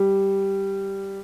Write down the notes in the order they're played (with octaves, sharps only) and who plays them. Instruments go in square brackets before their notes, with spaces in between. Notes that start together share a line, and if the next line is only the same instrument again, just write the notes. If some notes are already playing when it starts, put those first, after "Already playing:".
Already playing: [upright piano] G3